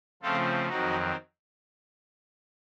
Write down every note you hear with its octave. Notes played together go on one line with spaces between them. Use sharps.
C#3 F3 A3 C4 F4 A4
F2 D#3 F#3 C4 D#4 F#4